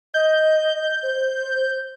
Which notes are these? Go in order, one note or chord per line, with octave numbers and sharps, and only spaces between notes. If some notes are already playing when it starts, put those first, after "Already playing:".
D#5 G6
C5